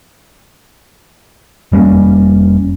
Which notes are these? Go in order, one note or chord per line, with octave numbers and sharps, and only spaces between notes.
F1 G3 A#3 C#4